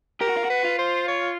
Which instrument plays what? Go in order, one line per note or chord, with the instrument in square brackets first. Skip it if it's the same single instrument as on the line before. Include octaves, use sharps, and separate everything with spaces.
[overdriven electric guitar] G4 [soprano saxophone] A#4
[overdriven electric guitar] F#4
F4
F#4
[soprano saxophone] B4
[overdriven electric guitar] F4
[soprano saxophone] C5
C#5